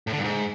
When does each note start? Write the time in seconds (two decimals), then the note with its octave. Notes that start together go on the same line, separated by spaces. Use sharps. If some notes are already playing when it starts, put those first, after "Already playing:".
0.07 A2
0.13 D3
0.18 G2
0.24 G#2